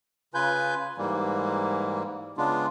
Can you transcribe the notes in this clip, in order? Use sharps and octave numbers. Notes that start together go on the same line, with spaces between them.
C#3 F4 B4 G#5 G6
G#2 E3 G3 A#3
C#3 G#3 B3 D4 F4